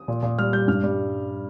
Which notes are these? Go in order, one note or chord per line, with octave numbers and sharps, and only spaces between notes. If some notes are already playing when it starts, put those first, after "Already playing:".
Already playing: D#6
A#2
A#2
G3 F6
G3 G6
G2 F6
G3